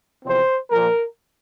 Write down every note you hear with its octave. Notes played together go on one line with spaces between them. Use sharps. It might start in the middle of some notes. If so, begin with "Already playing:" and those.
E2 C3 F3 C4 C5
A#2 F3 A#3 A#4